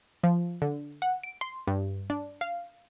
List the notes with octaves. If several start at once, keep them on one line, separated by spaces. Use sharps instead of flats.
F3
D3
F#5
D7
C6
G2
D4
F5